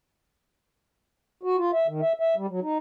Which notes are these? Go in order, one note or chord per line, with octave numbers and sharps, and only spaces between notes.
F#4
F4
E5
D#3
E5
E5
G3
F#3
D#4